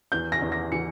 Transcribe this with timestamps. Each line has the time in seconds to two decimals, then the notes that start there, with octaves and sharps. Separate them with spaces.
0.12 E2 G6
0.32 A#6
0.42 E2
0.52 A#6
0.72 E3 C#7